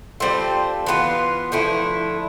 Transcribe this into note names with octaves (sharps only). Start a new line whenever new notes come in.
G3 C4 F4 A4
E3 B3 F4
D3 F3 A3 E4